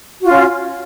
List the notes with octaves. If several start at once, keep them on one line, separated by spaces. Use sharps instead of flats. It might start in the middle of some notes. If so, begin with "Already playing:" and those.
C#4 F4 F#4